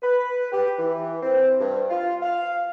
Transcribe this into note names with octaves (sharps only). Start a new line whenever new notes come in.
B4
G4
E3
C4
G2
F4
F5